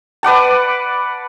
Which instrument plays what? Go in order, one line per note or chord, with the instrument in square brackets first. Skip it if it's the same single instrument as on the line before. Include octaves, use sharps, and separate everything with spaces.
[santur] B4 D5 F#5 A5